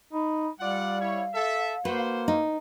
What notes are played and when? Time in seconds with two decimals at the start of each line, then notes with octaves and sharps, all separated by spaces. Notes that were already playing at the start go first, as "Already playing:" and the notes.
0.13 D#4 B5
0.60 G3 F4 D5 F5 F#5
1.00 E4 C#5
1.34 A4 E5
1.85 A#3 F#4 B4 C5
2.28 D#4